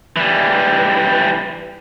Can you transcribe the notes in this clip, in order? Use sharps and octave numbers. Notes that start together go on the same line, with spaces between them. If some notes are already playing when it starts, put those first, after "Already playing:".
E3 G3